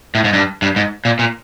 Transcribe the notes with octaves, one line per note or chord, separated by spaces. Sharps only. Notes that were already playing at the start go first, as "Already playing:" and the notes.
A2
G#2
G2
G2
G#2
A#2
A#2